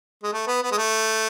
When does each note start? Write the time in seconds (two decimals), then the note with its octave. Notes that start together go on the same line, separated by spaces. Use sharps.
0.23 G#3
0.33 A3
0.47 B3
0.62 B3
0.72 G#3
0.78 A3